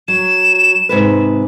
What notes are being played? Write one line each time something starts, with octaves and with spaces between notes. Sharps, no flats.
F#3 E7
G#2 C3 B4